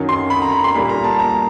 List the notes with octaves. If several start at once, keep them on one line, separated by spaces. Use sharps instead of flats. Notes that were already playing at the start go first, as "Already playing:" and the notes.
Already playing: F#2 D#3 F#3
C6
B5
A#5
B5
C6
A#2 G3 A#3 B5
A#5
A5
A#5